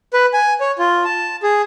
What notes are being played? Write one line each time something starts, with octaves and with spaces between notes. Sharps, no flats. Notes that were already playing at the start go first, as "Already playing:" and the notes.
B4
G#5
C#5
F4
A5
G#4